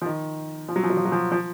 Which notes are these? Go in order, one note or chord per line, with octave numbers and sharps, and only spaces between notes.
F3
D#3
F3
F#3
F3
F#3
F3
F#3
F3
F3